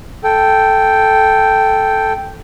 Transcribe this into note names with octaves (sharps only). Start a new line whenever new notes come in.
A4 G5